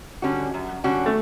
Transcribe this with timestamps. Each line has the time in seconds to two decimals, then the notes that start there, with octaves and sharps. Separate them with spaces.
0.22 D3 G3 C#4 F#4
0.54 F#2
0.84 D3 G3 C#4 F#4
1.06 A3